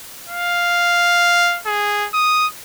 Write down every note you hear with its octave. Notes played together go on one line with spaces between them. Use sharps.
F5
G#4
D#6